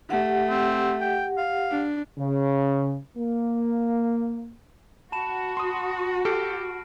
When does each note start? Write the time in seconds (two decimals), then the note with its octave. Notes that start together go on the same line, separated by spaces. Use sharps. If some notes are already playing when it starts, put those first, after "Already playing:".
0.10 A3 G4 F#5
0.50 C4
1.01 G5
1.37 F5
1.71 D4
2.18 C#3
3.18 A#3
5.12 F#4 A5 B5 E7
5.57 C6 D#6
6.25 G4 A4 F6 C7 D7